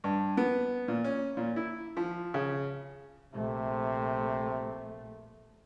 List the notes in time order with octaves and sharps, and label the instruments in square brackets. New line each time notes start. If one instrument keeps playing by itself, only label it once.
[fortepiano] G2
B3
A#2
C#4
A#2
E4
F3
C#3
[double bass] A#1 A3 [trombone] C3